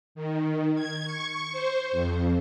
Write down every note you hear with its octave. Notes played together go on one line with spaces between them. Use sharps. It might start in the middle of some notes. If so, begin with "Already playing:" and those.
D#3
G#6
C#6
C5
F2